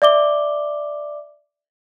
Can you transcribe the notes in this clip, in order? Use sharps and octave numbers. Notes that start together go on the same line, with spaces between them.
D5 E5 D6 G7